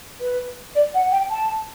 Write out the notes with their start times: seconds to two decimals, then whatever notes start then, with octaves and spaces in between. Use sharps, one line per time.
0.20 B4
0.75 D5
0.94 F#5
1.12 G5
1.30 A5